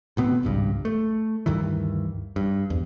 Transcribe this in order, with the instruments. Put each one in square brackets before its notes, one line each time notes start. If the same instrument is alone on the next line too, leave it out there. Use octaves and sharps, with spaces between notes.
[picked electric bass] D2 B2 B3 C4
G#1 C#2 G2
A3
D2 G2 D#3 E3
G2
E2